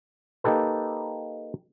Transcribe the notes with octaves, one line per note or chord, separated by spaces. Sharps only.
A#3 D#4 G4 A4 B4